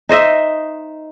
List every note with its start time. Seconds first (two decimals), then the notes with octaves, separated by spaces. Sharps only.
0.09 D#4 C5 D#5 E5